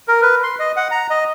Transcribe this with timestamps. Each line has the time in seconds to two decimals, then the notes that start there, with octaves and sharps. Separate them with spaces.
0.08 A#4
0.22 B4
0.43 C6
0.59 D#5
0.76 F#5
0.91 A#5
1.10 D#5